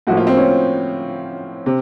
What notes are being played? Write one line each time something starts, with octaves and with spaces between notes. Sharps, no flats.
A2 F3 A#3 F#4
F4
C4
C#4
C3